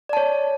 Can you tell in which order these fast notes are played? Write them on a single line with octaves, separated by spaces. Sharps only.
D5 A5 C#5